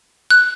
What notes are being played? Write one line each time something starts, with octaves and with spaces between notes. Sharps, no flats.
F#6